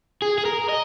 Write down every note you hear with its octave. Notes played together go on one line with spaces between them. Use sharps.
G#4
G#4
A#4
D#5